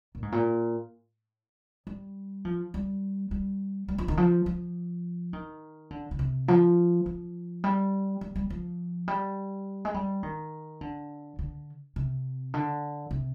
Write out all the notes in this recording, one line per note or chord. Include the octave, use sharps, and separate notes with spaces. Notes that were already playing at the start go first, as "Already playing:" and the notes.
A#2
G#2
A#2
G3
F3
G3
G3
G3
F3
D#3
F3
F3
D#3
D3
D3
C3
F3
F3
G3
G3
G3
F3
G3
G#3
G3
D#3
D3
D3
C3
D3
C3